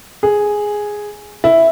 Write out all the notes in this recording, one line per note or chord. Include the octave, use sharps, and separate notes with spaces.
G#4
E4